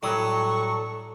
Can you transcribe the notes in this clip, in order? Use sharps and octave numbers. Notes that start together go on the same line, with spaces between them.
A2 F#3 G3 A4 C#6 D#6